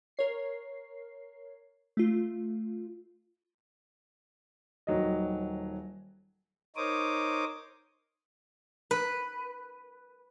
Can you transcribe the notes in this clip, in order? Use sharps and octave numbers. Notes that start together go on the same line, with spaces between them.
A#4 C#5 C7
A3 F4
D#1 D#3 F#3 D#5
D#4 A#4 C5 C#5 D6 D#6
B4